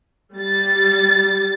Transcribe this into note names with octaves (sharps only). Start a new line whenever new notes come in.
G3 A6